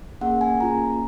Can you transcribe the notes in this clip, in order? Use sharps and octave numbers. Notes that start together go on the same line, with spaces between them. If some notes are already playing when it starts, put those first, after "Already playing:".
A#3 C#4 G#4 F#5
G#5
A#3 C#4 F4 G#4 A#5